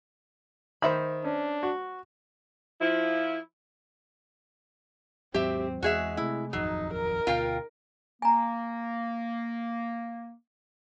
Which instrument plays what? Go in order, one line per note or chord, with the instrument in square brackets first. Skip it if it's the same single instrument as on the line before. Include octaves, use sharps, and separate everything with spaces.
[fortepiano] D#3 [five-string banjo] C5 E5 B5
[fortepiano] C#4 [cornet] D4
[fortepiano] F#4
[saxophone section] F3 E4
[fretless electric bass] D#2 G#2 F#3 [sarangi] C4 [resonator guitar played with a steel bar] G4 E5
[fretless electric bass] E2 [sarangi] G#3 [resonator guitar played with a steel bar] F#4 G#4 E5
[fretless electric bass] C3 A3 [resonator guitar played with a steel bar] E4
[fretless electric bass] D#1 G#1 F2 [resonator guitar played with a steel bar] F#3 [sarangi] D#4
[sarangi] A#4
[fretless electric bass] D2 B2 [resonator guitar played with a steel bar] F4 F5 G5
[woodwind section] A#3 [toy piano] G#5 A#5